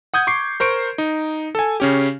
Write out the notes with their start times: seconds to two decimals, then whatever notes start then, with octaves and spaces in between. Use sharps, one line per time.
0.14 F#5 D#6 G6 G#6
0.27 C#6 D6 C7
0.60 A#4 C5 C#6 D7
0.98 D#4
1.55 A4 G#5
1.80 C#3 C#4 G4